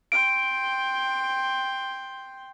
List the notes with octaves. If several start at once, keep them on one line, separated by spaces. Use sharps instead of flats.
G5 C6 D7